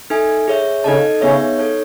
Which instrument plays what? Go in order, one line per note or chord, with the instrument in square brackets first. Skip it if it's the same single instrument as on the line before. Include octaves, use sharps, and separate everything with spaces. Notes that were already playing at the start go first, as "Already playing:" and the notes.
[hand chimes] D#4 A4 E5 G#5
G#4 C#5 E5
[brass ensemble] C#3 [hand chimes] D#4 A4 D#5 A5
[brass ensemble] C#3 [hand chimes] B3 D#4 G#4 C#5 E5
[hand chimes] D#4 A4 C#5